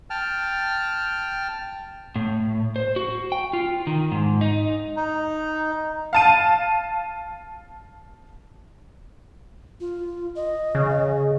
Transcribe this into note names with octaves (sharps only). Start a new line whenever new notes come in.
G5 A5 F6
A2
C5
F#4
G5
F4
D#3
G#2
D#4
D#4
F5 A5 D#7
F4
D#5
C#3